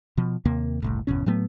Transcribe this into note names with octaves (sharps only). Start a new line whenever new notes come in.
B2 F3
D#2 C3 A#3
F#1 C2 A2
G1 E2 B2 C#4
A2 F#3 A3 B3